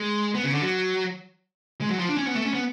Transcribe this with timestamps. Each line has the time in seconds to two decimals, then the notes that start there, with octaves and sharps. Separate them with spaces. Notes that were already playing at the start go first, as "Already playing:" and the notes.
Already playing: G#3
0.35 B3
0.43 C#3
0.53 D3
0.62 F#3
1.81 G#3
1.90 F#3
1.99 F3
2.09 D4
2.17 C#4
2.27 B3
2.35 A3
2.45 C#4
2.54 B3